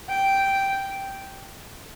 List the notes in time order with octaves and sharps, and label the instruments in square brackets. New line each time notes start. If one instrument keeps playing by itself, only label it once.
[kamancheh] G5